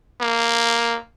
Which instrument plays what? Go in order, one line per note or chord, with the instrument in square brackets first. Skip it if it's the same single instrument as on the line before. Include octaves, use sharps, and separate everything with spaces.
[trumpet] A#3